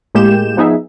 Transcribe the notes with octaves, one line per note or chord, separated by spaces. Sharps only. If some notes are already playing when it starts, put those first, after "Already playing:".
A2 G#3 A#3 G4 G6 E7
F3 B3 D#4 G#4 E5